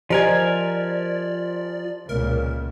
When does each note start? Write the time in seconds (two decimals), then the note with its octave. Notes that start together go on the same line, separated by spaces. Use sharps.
0.10 F3 G4 A#4 C5 D5 D#5 G#5
2.09 C#2 A#2 A#4